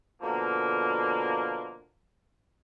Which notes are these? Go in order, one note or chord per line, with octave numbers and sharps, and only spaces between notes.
B2 D3 F3 A#3